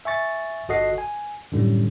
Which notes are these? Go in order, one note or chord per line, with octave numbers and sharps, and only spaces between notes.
E5 G#5 C#6 A6
G1 F#4 A4 D#5 F#5 C7
G#5
F#2 A2 D3 G3 C#4